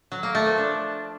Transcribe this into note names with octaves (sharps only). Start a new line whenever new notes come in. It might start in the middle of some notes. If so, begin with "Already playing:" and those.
F#3
A#3
A3
F3
D4